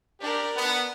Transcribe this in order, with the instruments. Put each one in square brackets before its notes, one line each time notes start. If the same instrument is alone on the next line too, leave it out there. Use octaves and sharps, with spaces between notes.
[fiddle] D4 A#4 [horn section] G4
[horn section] B3